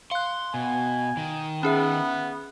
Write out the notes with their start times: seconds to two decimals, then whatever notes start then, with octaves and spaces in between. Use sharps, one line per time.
0.11 F5 C6 F#6
0.54 B2 G#5
1.17 D#3
1.63 B3 C#4 G#4 E5